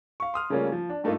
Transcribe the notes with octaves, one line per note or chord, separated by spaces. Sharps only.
F5 C#6
C6 D#6 F6
C#3 G3 A3 A#3 C#4 F4
F3
D4
G2 A3 A#3 D#4 F4